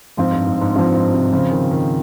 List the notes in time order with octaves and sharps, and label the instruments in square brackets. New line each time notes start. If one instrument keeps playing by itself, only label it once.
[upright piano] G#2 [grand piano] F3 C4 F4
[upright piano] G2
G#2
G#2
[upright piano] G2 [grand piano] F3 C4 F4
[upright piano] G#2
C3
[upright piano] C#3 [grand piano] F3 C4 F4
[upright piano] D#3
D#3